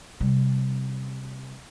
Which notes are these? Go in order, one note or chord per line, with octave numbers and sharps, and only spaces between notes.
C3 G3